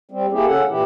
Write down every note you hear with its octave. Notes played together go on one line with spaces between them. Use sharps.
G3 C4
A#3 E4 G4 G#4
C#3 C#4 A4 F#5
A#2 E3 E4 G4